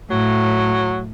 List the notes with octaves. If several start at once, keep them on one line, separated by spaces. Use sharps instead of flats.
A2 F#3